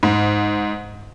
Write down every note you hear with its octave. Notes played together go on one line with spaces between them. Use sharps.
G#2